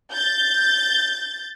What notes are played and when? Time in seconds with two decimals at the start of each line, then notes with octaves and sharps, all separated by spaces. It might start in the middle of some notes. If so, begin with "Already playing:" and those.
0.14 G6 A6